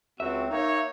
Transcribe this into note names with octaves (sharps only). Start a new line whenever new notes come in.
C#2 C4 F#4 E5
A#3 D#4 C#5